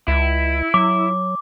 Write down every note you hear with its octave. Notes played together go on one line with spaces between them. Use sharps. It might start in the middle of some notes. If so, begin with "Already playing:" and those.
C#2 E4
F#3 D6